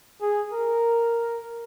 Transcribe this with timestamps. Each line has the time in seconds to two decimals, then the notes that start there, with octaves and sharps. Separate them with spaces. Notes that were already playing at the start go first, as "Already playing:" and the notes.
0.21 G#4
0.52 A#4